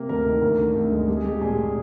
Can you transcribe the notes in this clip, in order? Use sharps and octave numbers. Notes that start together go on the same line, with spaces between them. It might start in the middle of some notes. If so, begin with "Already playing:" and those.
Already playing: C3 A#3
D2 A#4
D#3
D2 A#4
D3
D2
G#3
G#3 G4
G#4
G#3 G4
A#2 G#4
A#2